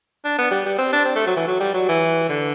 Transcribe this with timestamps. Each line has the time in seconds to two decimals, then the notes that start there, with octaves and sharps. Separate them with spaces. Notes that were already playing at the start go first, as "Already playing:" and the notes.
0.25 D4
0.38 B3
0.51 G3
0.65 G3
0.78 C4
0.93 D4
1.05 C4
1.16 A3
1.26 F#3
1.36 E3
1.47 F#3
1.60 G3
1.74 F#3
1.88 E3
2.29 D3